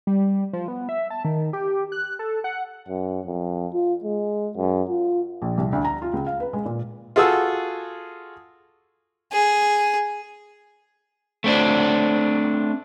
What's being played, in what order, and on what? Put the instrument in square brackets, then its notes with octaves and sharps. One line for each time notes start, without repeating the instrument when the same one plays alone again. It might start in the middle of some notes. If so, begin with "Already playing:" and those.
[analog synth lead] G3
F3
B3
E5
A5
D#3
G4
F#6
A4
F#5
[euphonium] F#2
F2
F4
G#3
F#2
F4
[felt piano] A#1
C2
D2
A#5
F4
C#2
F5
B4
G#3
A#2
[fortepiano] F4 F#4 G#4 A4 E6
[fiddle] G#4
[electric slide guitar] A3 C4 D4